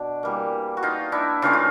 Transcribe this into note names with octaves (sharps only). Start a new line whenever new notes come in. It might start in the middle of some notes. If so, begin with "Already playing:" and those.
Already playing: B2 D4
E3 G3 A#3
F#4
D#4 F4
D4 E4
C#3 E3 A3 C#4 D#4 F4
F4